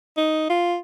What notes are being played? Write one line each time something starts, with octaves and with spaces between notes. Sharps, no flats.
D#4
F4